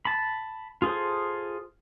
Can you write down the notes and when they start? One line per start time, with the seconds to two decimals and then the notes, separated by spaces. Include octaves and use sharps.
0.05 A5 B5
0.82 F4 G#4 A4 C5